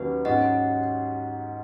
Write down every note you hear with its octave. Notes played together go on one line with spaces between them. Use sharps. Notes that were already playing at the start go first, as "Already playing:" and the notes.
Already playing: D#2 D#3 F#3 C#4 B4
G#2 F#3 C#4 D#5 F#5